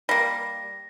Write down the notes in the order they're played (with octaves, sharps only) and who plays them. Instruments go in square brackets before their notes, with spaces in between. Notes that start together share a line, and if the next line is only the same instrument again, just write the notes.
[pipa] G3 A#3 [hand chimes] A#6